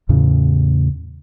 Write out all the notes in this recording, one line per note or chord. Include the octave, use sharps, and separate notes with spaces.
E2 A2 C#3